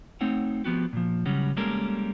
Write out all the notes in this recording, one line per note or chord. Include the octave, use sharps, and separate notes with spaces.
A3 C4 D#4 C#5 F#5
F3 B3 F#4 G4
A#2 F3
C#3 F#3 G3 C#4 F#4
G3 G#3 A#3 C#4 A4 A#4